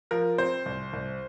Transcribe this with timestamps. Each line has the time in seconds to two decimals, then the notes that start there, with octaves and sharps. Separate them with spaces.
0.11 F3 A#4
0.38 C4 C5
0.66 C2
0.93 C2